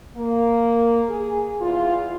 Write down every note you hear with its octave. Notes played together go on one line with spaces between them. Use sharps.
A#3
G#4
E2 F4